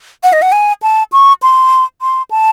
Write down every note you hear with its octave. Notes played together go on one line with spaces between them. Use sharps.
F#5
D#5
F#5
G#5
A5
C#6
C6
C6
A5